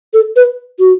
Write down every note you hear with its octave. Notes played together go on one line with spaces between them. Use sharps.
A4
B4
F#4